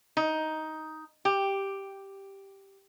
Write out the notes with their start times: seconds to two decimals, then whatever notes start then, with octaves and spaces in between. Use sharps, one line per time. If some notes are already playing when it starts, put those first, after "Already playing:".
0.17 D#4
1.25 G4